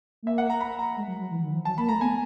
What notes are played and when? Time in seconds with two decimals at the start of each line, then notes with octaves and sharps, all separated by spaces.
0.22 A3
0.26 A#3 E5
0.38 F#5
0.50 A#5
0.61 B5
0.79 A#5
0.96 G#3
1.08 F#3
1.19 F#3
1.31 E3
1.43 D#3
1.54 F3
1.65 F#3 A5
1.78 A#3 B5
1.89 A3 A#5
2.01 B3 G#5